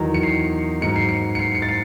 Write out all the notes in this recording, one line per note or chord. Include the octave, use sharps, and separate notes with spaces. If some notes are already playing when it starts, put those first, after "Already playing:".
Already playing: E2 D#3 F#3
C#7
C7
G#2 F#3 C#7
C7
C#7
C#7
C7
C#7
A6
C7